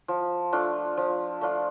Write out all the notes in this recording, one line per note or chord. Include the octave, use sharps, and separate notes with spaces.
F3
A3 D4 F4
F3
A3 D4 F4